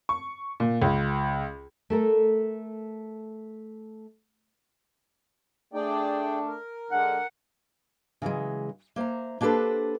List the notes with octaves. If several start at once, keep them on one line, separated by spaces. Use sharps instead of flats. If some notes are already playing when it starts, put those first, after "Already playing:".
C#6
A#2
C#2
A3 A4 A#4
A3 D4 G#4 D5 G5
A#4
D3 G#3 F#5
C#3 E3 F#3 G#3
A#3 C5 E5 A#5
A#3 D4 G4 A4 B4 C5